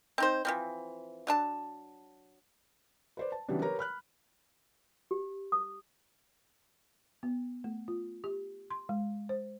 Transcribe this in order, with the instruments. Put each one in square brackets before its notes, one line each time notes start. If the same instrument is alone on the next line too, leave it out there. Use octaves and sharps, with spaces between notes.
[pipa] C4 D#4 C5
E3 F3 C4
F#3 D4 A5
[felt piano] B4 C5 D5
A5
C#3 E3 F#3 G3 B3 D4
G4 A#4 B4 C#5 A#5
B5 F6 F#6
[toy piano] G4
D#6
[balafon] B3
A3
F4
G4
C6
G#3
C5